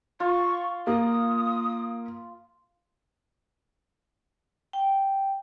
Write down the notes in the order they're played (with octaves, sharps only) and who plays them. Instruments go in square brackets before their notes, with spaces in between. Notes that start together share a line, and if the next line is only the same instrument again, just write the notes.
[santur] F4 [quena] C#6
[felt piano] A#3 [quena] D#6
[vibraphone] G5